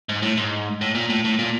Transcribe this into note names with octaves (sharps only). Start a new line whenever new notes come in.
G#2
A2
G#2
A2
A#2
A2
A2
A#2